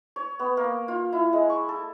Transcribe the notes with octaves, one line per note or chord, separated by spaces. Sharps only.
C#5
B3
A#3
F4
E4
G#3
C#6
A4